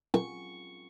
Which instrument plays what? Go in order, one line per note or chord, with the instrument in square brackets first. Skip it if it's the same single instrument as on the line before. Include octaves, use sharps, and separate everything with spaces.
[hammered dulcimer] C#6